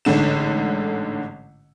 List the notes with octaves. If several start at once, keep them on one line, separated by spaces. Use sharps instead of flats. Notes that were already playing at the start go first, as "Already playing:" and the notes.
A1 G#2 D3 E7